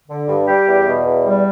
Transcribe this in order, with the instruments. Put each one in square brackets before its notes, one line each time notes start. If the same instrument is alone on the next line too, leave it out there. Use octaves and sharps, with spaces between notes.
[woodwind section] D3
G2
G3 G4
E2
B2
E2
G3